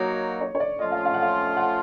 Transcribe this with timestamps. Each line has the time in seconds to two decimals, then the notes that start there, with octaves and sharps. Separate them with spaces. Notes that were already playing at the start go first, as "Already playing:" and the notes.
Already playing: F#3 A#3 D#4 C#5
0.41 C#5
0.55 C#5
0.60 D5
0.79 F3 A3 C#4 F4 D#5
0.92 F5
1.06 F5
1.14 F#5
1.22 F5
1.57 F#5